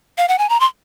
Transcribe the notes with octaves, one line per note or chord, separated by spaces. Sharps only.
F5
F#5
G#5
A#5
C6